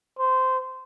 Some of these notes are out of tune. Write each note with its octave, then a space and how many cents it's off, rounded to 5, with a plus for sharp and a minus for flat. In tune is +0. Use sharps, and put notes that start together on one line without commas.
C5 -15